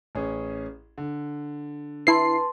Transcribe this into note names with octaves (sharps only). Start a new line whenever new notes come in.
A1 C#4 G#4
D3
E4 B4 A5 C6 C7